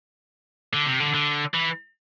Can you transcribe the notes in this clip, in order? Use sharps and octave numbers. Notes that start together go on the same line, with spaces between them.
D3
C3
D3
D3
E3